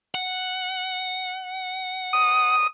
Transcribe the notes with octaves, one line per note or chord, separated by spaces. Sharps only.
F#5
D#6